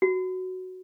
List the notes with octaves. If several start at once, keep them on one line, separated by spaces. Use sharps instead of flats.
F#4